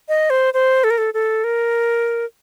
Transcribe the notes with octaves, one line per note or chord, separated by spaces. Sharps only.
D#5
C5
C5
A4
A#4
A4
A4
A#4